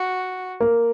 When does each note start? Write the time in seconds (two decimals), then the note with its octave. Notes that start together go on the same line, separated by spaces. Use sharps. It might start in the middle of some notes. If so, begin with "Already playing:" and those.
Already playing: F#4
0.60 A#3